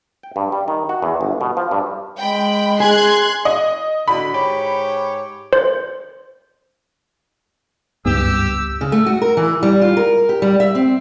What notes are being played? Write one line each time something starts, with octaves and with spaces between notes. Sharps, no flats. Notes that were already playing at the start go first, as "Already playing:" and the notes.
G5
G2
G3
D#3
F#4
E2
G1
B2
F3
G2
G#3 G5 B5
G#4 C6 F#6 G#6
D#5
D3 F#4 B5
G#2 G4 C#5
C5
F#1 C#2 G2 B3 G4 E6
C#3
A3
F#4
A#4
E3
G3
F4
A#4
G4
G3
E5
C4